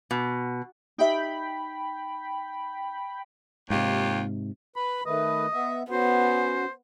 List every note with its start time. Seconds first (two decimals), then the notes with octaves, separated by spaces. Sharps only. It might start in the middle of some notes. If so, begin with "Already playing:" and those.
0.11 B2
0.98 D#4 G4 E5 G5 B5
3.70 D#2 G#2 C3 F4 G4
4.76 B4 B5
5.06 D#3 A3 B4 D#5
5.53 B3 E5
5.90 B3 C#4 F#4 C5